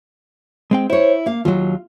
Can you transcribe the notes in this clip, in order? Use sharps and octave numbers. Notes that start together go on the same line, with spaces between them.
G#3 C4 G5
E4 C5 C#5
A#3 F5
D#2 F#3 F4